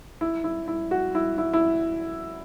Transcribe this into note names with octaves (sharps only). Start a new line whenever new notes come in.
E4
E4
E4
F#4
E4
E4
E4